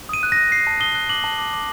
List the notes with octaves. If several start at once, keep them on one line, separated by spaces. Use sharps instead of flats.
D#6 D#7
F#6
A#6
F#6
F#6 C7
A5
D#6 G7
F#6
D6 F#7
A5
D6
D6